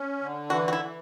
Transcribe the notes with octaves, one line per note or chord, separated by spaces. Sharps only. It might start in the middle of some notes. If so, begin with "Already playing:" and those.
Already playing: C#4
D3
E3 F#4
F#4
E4
E3